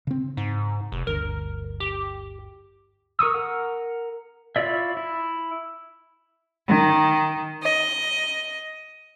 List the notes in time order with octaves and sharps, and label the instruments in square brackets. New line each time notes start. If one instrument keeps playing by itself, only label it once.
[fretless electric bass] C#3 C4
[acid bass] G#2
F1
[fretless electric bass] G1 D2 [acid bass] A#4
[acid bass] G4
[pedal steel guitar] A#4 C#6 D#6 E6
A#4 F#5
E4 F4 C#5 D5 E5
E4
[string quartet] D#3
D#5